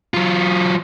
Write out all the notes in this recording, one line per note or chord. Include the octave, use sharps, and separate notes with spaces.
F#3 F4